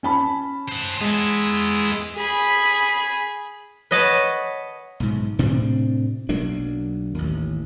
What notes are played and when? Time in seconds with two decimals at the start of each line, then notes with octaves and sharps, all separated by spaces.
0.03 C#4 A5 B5
0.69 C5 F#5
1.01 G#3 B3 E4
2.16 G#4 B5
3.91 B4 C#5 D#5 F#5 A5
5.00 B1 G#2
5.39 A2 C3 C4 D4
6.29 B1 F#3 A#3 D4
7.15 A1 D#2